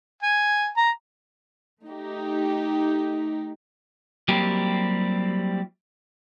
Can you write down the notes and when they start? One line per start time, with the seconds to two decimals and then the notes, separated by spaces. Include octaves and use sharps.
0.23 G#5
0.77 A#5
1.85 A3 D#4 G4
4.28 F#3 G3 A#3 C4 E4 G4